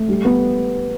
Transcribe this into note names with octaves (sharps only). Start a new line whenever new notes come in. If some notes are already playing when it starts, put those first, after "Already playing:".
Already playing: A3
G3
B3